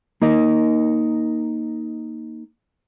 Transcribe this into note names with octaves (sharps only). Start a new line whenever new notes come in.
A#3 D#4 A#4 D#5